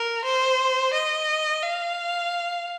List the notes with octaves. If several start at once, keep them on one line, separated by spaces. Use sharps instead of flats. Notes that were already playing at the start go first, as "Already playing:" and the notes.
Already playing: A#4
C5
D#5
F5